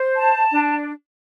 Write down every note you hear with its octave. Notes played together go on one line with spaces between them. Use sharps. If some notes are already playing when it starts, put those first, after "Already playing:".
Already playing: C5
A5
D4